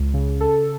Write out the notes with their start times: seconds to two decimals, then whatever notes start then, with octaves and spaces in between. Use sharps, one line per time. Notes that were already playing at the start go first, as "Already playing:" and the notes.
Already playing: C#2
0.14 C#3
0.41 A4